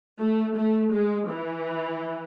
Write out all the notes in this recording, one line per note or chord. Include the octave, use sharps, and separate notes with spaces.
A3
A3
G#3
E3